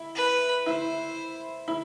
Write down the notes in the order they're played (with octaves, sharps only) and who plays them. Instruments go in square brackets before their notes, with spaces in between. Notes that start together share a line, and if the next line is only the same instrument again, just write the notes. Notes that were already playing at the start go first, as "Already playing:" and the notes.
Already playing: [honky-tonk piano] E4
[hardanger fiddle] B4
[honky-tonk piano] E4 [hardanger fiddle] C5
[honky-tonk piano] E4